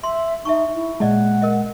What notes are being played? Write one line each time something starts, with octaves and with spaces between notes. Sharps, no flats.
E5 C6
D#4 E5 A5 C#6
E4
A#2 G#3 D5 D#5 F#5 A5
A#4 D#5